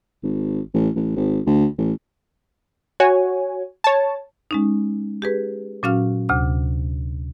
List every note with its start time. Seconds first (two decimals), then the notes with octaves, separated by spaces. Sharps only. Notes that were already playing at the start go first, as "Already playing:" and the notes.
0.23 G#1
0.74 A1
0.96 A1
1.16 G#1
1.46 D2
1.78 A1
3.00 F#4 C#5 G#5
3.84 C#5 A5
4.51 G#3 C#4 D#4
5.22 G4 G#4 B4
5.83 A#2 F#3 C#4 F#4 F5 F6
6.29 D2 C3 D6